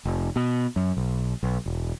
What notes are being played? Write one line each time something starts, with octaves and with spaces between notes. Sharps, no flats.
F1
B2
F#2
B1
B1
E1